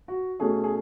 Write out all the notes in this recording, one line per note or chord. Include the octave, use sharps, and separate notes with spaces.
F#4
B2 A3 C#4 G#4
G#4